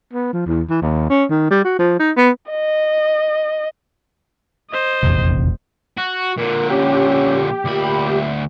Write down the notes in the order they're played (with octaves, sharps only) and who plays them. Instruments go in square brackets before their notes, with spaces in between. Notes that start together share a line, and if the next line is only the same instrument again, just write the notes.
[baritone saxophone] B3
F3
E2
E3
D#2
C#4
D#3
G3
F#4
F3
D#4
B3
[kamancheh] D#5
[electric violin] C5 D#5
[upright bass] F1 [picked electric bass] A#1 E2 C3
[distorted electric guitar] F#4
[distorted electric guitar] A#2 D3 [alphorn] A#4
[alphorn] C#4 [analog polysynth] G4
[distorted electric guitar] D2 B5 [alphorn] A#2